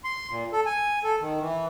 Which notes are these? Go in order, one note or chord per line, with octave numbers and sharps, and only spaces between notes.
C6
A#2
A4
G#5
A4
D#3
E3